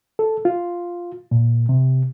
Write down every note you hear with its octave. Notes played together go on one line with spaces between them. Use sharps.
A4
F4
A#2
C3